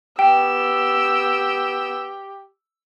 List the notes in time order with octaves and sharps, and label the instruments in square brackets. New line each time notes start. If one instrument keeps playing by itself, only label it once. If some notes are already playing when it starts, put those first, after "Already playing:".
[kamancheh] B3 E6 [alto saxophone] G4 [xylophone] G5